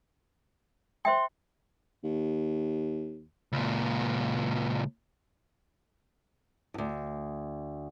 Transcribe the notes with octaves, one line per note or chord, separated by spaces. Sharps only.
C5 E5 G5 C6
D#2
C#2 A#2
D2 G2